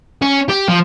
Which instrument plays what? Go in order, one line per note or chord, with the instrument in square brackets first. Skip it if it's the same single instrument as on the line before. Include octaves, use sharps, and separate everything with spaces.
[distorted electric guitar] C#4
G4
F3